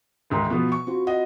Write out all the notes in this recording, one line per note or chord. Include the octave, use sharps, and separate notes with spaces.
D2 G#2 D#3
B2 F3 B3
C#6
C4 F4 F#4
D#5 F#5